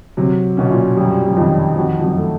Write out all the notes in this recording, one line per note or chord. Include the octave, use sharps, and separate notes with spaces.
C3 F#3
B2 C#4
A#2
F#2 G3
F#2
F2 D#3
F2 F#4
F2
F#2
A3